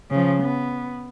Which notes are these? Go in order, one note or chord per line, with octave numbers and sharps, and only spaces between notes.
C#3 F3
B3